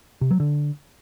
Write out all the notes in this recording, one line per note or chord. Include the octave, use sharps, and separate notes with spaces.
C3
F#3
D3